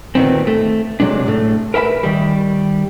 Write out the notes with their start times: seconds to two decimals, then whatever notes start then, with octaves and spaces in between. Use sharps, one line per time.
0.15 D2 A#2 D#3 B3 C4
0.47 A3
1.00 C3 F#3 G#3 D4
1.26 A2 A3
1.74 A#4 B4 E5 F#5 B5
2.03 D#3 G3